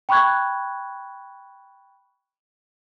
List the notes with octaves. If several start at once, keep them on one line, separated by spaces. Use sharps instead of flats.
G5 B5 C#6 F#6 G#6